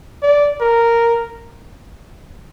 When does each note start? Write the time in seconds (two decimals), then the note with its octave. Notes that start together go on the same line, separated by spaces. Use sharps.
0.23 D5
0.61 A#4